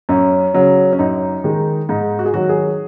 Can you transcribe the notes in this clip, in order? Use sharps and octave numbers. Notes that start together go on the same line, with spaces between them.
F#2 C#4
C#3 F#3
C#4
F#2 D#4
D#3 G#3
G#2 D#4
F#4
G#4
D#3 F#3 F#4
G#4